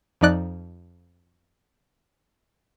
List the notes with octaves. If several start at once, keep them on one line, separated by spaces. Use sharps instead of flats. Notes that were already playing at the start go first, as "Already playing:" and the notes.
F2 F3 D#4 D5 F#6